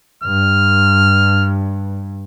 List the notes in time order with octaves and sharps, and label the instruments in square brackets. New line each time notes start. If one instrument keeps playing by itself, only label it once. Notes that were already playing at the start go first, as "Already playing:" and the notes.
[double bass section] G2 [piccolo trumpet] F6